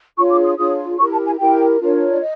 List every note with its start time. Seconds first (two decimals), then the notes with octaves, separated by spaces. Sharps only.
0.17 D4 F4 G#4 C#5 C#6
0.31 D6
0.45 D#6
0.58 D4 F4 G#4 C#5 D#6
0.99 E4 G4 A#4 C#6
1.12 A5
1.26 G#5
1.39 E4 G4 A#4 G5
1.80 D4 F4 A#4 C#5
2.09 D5
2.20 D#5